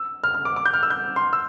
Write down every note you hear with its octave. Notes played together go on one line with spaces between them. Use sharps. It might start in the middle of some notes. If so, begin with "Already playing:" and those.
Already playing: E6
F6
F6
D6
D6
G6
F6
E6
G6
C6
E6